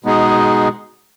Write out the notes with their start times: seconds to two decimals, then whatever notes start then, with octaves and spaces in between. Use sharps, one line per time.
0.04 B2 G#3 B3 D#4 G#4